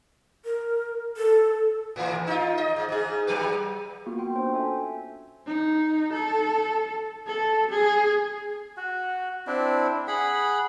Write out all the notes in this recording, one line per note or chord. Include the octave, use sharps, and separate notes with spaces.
A#4
A4
A2 E3
D#4 F4
D#5
G#2
G#2 G#4
F#3 G4 B4
A#3 B3 F4 F#4
G5 C6
C#4 D4 C5 G5
A4 E5 G#5
D#4
A4
A4
G#4
F#4
C4 D4 E4
G#4 F#5 B5